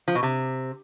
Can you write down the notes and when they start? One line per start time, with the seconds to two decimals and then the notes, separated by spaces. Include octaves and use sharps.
0.08 F3
0.15 B2
0.23 C3